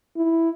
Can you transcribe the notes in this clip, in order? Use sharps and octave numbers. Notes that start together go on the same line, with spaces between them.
E4